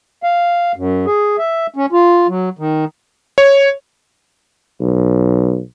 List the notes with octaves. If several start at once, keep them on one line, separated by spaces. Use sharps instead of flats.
F5
F#2
G#4
E5
C#4
F4
F#3
D#3
C#5
B1